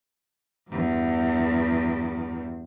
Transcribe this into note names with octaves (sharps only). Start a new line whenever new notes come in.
E2 G2